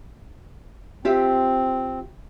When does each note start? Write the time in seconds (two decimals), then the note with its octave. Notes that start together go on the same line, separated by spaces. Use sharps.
1.05 C4 F4 G4 E5